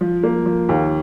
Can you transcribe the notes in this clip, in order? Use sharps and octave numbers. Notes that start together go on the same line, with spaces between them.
F3
A#3
F3
D#2